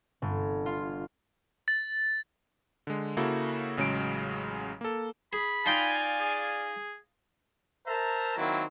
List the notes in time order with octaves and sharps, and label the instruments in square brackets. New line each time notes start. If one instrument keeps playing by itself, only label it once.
[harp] G1
F4
[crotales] A6
[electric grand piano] D3 G#3
C#3 A#3 E4 F#4 A4
A1 C#3 F#3 G#3 D7
A#3 A4
[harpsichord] G#4 [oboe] B5
[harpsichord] D#4 F4 G5 [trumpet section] D5 F5 G#5
[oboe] G#4
[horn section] A#4 C5 E5 A5 A#5
D#3 F#3 A#3 C4 E4